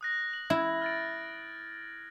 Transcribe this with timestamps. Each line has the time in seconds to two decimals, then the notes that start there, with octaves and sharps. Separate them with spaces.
0.01 D#6 F#6 A#6
0.33 F#7
0.50 E4 G#6
0.82 F6 A6 D7